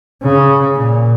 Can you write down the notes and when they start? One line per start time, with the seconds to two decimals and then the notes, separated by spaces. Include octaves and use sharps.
0.24 C#3
0.76 A#2